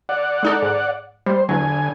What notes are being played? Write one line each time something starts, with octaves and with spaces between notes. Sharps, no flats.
D5 F#5
G#3 D#4 A4
G#2
G3 C5
E2 D3 F#3 G#5